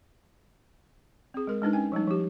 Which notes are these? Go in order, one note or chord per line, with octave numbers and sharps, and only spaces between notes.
C4 G#4
G#3 A#4
G#3 D4 D#4 B4
C#4 G#5
F3 G3 A3 D#4
F3 G4